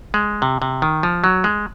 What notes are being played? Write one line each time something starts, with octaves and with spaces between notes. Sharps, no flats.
G#3
C3
C3
D#3
F3
F#3
G#3